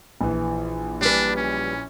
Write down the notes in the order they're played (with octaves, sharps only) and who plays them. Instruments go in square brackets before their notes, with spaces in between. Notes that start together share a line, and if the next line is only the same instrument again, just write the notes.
[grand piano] A#1 E3
[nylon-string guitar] G3 B4 [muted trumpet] D4
[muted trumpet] C#4